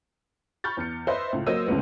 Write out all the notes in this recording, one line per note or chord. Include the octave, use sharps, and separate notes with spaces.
B5 C#6 F6 G6 A6
E2 C#7
B4 C5 D#5 E5 C6
C#2 A2
F#3 A#3 C5 D#5 E6 D#7
D2 A2 C#3 G#3 B3